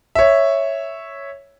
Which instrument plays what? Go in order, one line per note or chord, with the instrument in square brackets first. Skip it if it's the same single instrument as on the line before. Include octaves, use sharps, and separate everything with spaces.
[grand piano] C#5 E5